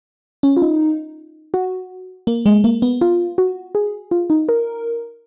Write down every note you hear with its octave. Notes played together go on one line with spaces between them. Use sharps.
C#4
F4
D#4
F#4
A#3
G#3
A#3
B3
F4
F#4
G#4
F4
D#4
A#4